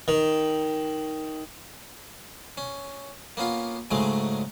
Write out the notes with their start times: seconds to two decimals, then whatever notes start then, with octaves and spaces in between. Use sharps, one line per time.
0.08 D#3
2.58 C#4
3.37 A#3 B3 C#4 F4
3.91 G#2 C#3 F#3 G#3 A3